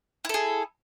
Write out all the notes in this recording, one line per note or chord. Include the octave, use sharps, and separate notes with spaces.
E4 G#4 A4